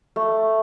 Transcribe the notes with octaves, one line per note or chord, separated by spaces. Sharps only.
A3